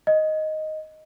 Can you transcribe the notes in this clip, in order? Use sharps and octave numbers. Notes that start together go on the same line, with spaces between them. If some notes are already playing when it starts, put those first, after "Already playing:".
D#5